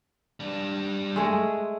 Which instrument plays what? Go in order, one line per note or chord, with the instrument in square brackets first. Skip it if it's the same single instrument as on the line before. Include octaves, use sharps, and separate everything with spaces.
[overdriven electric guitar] G3 D4
[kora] G#3 A3 G#4